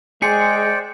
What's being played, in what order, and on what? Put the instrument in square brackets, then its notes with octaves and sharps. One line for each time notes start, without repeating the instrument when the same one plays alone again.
[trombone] G#3 [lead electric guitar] G#4 [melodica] C5 D5 G5 [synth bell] C#7